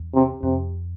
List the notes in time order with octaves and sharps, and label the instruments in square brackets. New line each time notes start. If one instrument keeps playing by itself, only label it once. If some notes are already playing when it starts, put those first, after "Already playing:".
Already playing: [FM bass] E2
[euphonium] C3
[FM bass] F2 [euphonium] C3